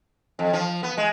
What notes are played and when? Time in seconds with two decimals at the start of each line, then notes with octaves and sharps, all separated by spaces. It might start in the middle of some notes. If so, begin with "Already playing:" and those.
0.39 F2
0.53 F3
0.83 B3
0.97 G#3